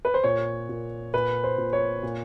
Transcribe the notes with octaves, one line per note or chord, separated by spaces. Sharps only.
B4
C5
A#2 C#5
A#2
A#2 B4
C5
A#2
C#5
A#2